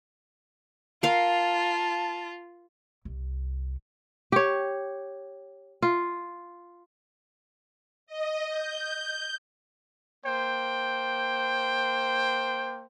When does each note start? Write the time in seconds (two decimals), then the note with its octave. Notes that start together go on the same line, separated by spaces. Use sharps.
1.03 F4 A#4 F5 A5
3.05 C2
4.32 G4 C#5
5.82 F4
8.07 D#5
8.49 G6
10.26 A#3 C5 G5